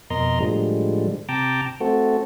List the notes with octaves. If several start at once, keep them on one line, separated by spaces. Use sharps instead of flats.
F2 B2 A#4 D#5 A#5 C6
A2 D3 F3 G3 G#3
C3 G5 A5 A#5 D6
A3 C4 F#4 A4